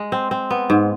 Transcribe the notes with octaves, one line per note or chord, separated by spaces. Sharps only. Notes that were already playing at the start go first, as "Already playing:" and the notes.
Already playing: G#3
C4
C4
B3
G#2